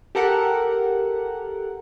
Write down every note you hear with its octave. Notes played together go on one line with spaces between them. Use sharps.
G4 A4 A#4 F#5